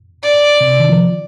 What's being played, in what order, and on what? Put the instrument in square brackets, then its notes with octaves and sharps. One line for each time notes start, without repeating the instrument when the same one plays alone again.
[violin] D5
[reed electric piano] C3
D#3
F3